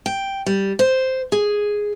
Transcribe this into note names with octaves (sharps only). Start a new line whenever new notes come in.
G5
G3
C5
G#4